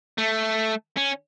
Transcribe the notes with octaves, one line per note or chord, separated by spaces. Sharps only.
A3
C#4